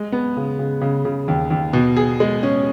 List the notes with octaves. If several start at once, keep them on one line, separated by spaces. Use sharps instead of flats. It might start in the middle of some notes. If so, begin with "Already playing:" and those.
Already playing: G#3
B3
C#3
C#3
C#3
C#3
D#2
D#2
B2
G#4
G#3
C#4